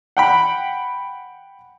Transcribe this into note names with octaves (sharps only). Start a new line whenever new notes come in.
F#5 G5 B5